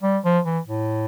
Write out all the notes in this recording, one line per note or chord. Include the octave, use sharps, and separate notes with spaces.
G3
F3
E3
A2